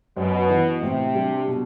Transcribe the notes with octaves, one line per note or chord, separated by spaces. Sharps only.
F#2 B2
E3 B3
A2 C3
G3 D4
B2